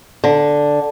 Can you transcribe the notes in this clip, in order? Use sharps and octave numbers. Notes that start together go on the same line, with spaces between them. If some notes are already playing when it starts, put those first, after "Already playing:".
D3